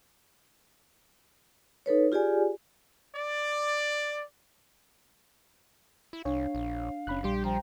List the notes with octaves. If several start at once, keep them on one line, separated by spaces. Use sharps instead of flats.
D#4 A4 B4 C#5
F4 G4 G#4 D5 G#5
D5
E4
C2 D4 C#5 F5
A#1
F#1 C#4 B5 F#6
A#1 G3 G4 C6
F3 C5 G5 A#5